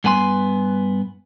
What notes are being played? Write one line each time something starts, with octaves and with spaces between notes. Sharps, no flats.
G2 B3 B4 G#5 A#5 C6